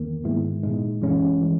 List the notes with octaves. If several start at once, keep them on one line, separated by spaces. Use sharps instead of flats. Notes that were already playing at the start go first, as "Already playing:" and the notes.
Already playing: E2 D#3 A#3
G#2 D#3 G#3 B3 E4
A#2 G#3 D#4
F#2 E3 G#3 C#4
E3 G#3